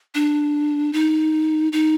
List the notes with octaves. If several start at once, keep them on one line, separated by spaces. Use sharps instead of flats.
D4
D#4
D#4